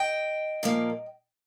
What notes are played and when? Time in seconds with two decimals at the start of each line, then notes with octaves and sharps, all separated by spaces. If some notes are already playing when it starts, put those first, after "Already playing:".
Already playing: D#5 G5
0.63 A#2 F3 A#3